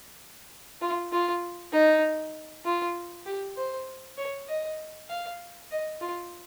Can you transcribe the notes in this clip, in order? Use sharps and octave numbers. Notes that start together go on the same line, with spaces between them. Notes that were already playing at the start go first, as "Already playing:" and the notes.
F4
F4
D#4
F4
G4
C5
C#5
D#5
F5
D#5
F4